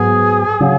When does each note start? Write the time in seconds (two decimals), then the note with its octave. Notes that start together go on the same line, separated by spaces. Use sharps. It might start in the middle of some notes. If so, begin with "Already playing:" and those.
Already playing: G#2 F#3 B3 G#4
0.60 C#3 F#3 C#4